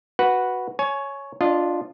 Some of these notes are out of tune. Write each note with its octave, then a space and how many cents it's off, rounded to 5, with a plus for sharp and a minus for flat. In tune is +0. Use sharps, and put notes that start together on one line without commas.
F#4 +0 B4 -5 F#5 +0
C#5 +0 G#5 +25
D4 +0 F4 +0 D#5 -25